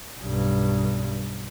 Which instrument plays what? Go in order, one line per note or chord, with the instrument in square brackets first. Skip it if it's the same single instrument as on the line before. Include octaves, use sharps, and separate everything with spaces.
[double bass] B1 G2